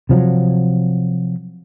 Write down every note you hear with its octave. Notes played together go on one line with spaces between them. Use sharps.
C3 F3 F#3